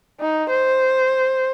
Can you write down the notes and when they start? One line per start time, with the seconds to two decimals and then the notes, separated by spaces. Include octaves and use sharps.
0.20 D#4
0.50 C5